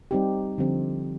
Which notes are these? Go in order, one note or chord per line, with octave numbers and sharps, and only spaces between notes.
G3 C4 D#4 G4
D3 F3 C4 G4